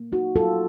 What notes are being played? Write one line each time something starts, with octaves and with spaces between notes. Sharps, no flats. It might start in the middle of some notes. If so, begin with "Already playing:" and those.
Already playing: A#3
D#4 F#4
F#3 F4 A4